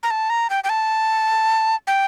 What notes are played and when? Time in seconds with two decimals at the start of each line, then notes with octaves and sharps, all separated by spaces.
0.03 A#5
0.11 A5
0.30 A#5
0.50 G5
0.64 G5
0.69 A5
1.87 G5